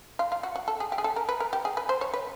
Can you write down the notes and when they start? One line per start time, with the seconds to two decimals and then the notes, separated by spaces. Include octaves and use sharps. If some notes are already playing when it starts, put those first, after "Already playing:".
0.19 F4
0.32 F4
0.43 F#4
0.56 F#4
0.68 A4
0.80 G#4
0.92 G4
0.98 G#4
1.04 A4
1.16 A#4
1.29 B4
1.40 A#4
1.53 G4
1.65 G#4
1.77 B4
1.89 C5
2.01 C#5
2.14 B4